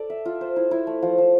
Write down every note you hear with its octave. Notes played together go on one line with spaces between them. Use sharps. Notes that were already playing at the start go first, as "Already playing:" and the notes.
Already playing: A4 D5
E5
F4
C5
E4
E4
A3
F3
F3